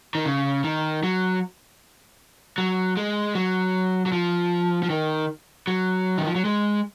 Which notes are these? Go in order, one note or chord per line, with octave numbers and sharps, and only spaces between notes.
D#3
C#3
D#3
F#3
F#3
G#3
F#3
F#3
F3
F3
D#3
F#3
D#3
F3
F#3
G#3